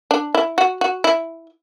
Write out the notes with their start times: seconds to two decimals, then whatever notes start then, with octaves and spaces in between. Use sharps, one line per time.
0.11 D4
0.35 E4
0.58 F#4
0.81 F#4
1.04 E4